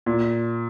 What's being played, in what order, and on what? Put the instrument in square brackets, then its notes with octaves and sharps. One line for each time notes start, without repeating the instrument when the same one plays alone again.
[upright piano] A#2